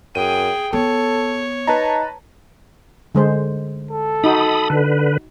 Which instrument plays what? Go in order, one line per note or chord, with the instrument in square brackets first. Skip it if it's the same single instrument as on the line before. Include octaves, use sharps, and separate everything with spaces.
[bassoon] F#2 [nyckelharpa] G#4 G5 [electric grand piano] D#7
[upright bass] B3 [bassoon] A4 [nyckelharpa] C#5
[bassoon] D#4 [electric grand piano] B4 A5 A#5
[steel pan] D3 G#3 C5
[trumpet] A4
[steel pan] D#4 F#4 [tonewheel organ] B5 D#6
[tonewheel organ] D3 B4